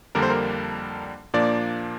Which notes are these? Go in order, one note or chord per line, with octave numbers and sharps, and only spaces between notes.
F2 D3 G3 A#3 D4 A#4
C5
A#4
A#2 F3 A#3 D4 D5